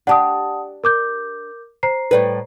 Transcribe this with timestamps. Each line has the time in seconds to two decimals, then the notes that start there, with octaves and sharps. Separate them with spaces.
0.07 D4 G4 F#5 A5 D#6
0.84 A#4 D6 G6
1.83 C5 A#5 C7
2.11 A2 G3 B4